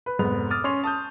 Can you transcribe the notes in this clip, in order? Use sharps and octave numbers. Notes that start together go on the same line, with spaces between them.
B4
F1 G#2 B3 F7
D6 D#6 F6 A6
C#4 C6 C#6 F7
A5 D#6 G6